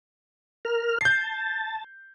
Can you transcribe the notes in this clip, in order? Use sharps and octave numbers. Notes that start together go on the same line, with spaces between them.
A#4 F6
A5 G6 C7